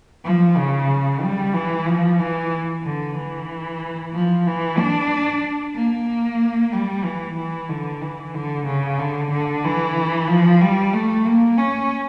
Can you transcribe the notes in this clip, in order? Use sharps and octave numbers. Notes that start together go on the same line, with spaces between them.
F3
C#3
G3
E3
F3
E3
D3
E3
F3
E3
D4
A#3
G3
E3
E3
D3
E3
D3
C#3
D3
D3
E3
F3
G3
A3
A#3
C#4